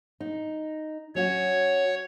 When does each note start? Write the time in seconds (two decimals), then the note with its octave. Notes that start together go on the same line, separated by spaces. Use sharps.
0.20 D#4
1.15 F#3 C#4 F#4 C#5